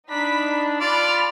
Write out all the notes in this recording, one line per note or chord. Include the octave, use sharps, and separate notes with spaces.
D4 D#4 B5 B6
F4 D5 A5 B5 F6